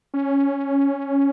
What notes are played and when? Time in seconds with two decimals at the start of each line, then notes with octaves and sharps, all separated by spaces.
0.14 C#4